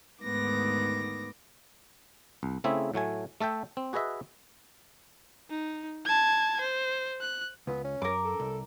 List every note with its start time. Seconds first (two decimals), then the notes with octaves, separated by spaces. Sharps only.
0.22 D2 G#2 D#3 B3 D6 A#6
2.43 C2
2.64 C#3 A3 C4 E4 G#4 E5
2.94 A2 F#3 A3 G#5
3.41 A3 A4 E5 G5
3.77 C4
3.93 F#4 G#4 B4 D#5 E5
5.50 D#4
6.05 A5 G#6
6.60 C5
7.21 F#6
7.67 C#2 B3
7.85 C#4
8.02 F#2 A#4 D6
8.25 A4
8.40 C2